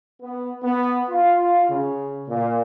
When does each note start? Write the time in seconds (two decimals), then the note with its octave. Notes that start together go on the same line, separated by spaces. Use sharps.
0.21 B3
0.62 B3
1.09 F4
1.69 C#3
2.28 A#2